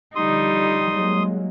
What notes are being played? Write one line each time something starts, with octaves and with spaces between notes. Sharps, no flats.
D3 F3 G3 D#4 C6 D#6
F#3 G#3 A#3